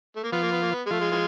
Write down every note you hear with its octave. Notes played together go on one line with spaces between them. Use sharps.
A3
A#3
F3 B3 F4
A#3
B3
A#3
B3
G#3
F3 A3 F4
G#3
E3 G#3